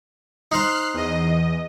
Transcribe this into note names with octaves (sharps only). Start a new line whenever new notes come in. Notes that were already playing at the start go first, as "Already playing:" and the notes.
D#4 C5 F6 F#6 C7
E2 D#5